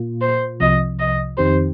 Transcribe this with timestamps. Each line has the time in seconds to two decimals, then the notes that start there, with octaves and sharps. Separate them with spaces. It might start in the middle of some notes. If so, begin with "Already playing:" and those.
Already playing: A#2 A#3 F4
0.21 C5
0.60 C2 C3 F3 D#5
0.99 D#5
1.37 F2 D#3 C4 D#4 G4 C5